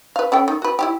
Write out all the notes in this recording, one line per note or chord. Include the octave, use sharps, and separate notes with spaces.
B4 F5
C#4 A4 G5
D#3
F#4 B4
E4 F4 G4